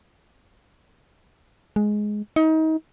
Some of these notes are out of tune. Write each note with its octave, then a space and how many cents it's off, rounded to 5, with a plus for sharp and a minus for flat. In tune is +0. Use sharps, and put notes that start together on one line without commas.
G#3 +10
D#4 +30